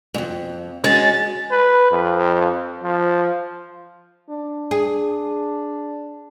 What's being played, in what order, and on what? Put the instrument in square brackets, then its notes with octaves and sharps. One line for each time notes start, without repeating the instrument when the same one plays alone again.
[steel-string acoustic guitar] F2 G#2
[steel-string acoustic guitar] G#3 C#4 F#4 [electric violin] A6
[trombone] B4
F2
F3
[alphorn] D4
[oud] G#4